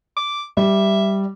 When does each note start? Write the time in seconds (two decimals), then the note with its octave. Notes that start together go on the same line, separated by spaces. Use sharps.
0.16 D6
0.57 G3 E5